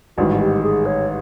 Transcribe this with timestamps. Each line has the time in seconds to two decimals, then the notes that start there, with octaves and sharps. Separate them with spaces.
0.17 A1 G#2 D#3 G3 F#4
0.40 G4
0.63 G#4
0.86 C#5